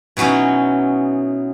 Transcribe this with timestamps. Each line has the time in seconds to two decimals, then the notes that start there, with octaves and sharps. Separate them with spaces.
0.17 B2 E3 F#3 C#4 D#4